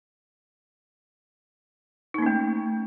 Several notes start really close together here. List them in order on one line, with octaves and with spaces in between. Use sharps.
D#4 A#3 C#4 A3